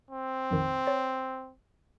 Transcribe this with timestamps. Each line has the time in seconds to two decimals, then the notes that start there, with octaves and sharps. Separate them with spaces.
0.11 C4
0.51 A#1 F2 D#3
0.86 C#5 A6